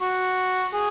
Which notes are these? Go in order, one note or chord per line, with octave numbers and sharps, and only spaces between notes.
F#4
G#4